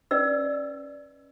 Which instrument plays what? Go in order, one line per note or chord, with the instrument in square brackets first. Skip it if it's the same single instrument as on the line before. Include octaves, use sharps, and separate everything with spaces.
[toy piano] C#4 B4 D5 D#5 E6